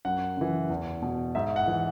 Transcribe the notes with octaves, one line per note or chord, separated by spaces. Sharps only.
F#2 F#5
C#3 E3
E2
B2
G#2 E5
F#5
E3